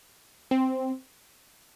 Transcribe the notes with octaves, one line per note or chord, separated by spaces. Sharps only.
C4